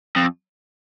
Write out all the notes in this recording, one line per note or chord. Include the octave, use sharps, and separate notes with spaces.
F2